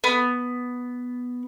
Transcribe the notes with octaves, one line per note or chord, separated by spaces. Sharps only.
B3